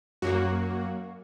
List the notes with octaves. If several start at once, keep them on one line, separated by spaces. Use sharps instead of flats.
F#2 F#3 A#3 F#4